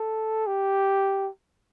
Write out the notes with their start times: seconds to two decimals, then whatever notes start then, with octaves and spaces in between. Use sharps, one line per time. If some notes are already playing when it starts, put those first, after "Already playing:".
Already playing: A4
0.47 G4